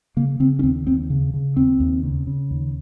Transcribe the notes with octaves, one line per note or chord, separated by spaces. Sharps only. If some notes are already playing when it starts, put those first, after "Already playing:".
C#3 A#3
C#3 C4
C#4
D#2 C4
D#2 C4
C#3
C#3
D#2 C4
D#2
C#3
C#3
D#2